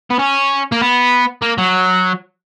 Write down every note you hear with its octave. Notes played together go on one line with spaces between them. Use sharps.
B3
C#4
A#3
B3
A#3
F#3